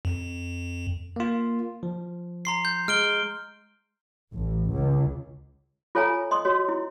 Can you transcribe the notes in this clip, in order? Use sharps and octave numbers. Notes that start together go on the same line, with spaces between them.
F2
A#3 F4
F3
A#5 C6 C7
G6
G#3 F6 D7 G7
A1
C#2
F4 A4 C#5 F5 G#5 A#5
D#5 C6 D#6
F#4 C#5
E4